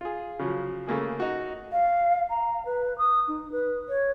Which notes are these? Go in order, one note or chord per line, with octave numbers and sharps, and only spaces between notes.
F4 G#4
C#3 F3 F#3
C#3 A3 A#3 G#4
D#4 F#4
F5
A#5
B4
D#6
D#4
B4
C#5